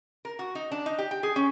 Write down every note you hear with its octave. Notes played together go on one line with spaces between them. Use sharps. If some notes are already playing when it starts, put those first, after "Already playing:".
A#4
F#4
D#4
D4
D#4
G4
G5
G#4
C#4